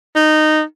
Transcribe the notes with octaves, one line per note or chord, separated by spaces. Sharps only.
D#4